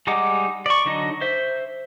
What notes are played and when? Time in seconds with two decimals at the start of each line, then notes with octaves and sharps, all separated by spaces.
0.07 G3 G#3 D#4 F#5 D6
0.66 D5 C#6
0.85 D3 F#3 D#4 D#5
1.21 C5 E5